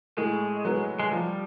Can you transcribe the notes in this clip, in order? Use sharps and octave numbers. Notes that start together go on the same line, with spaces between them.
A2 G#3
F#3 B3
G#3
F3 G3